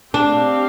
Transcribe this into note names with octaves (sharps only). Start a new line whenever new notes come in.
C4 D4 G4 F5